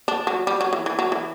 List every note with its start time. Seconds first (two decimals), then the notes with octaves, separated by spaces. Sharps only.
0.08 D4
0.27 F#3
0.47 G3
0.61 F#3
0.73 E3
0.86 E3
0.99 F#3
1.12 E3